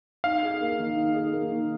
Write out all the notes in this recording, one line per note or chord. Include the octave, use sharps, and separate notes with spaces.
D#4 F5
G#4
A#3
D#3
D#4
G#4
A#3
D#3